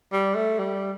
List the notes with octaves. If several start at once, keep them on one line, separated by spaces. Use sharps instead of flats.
G3
A3
G3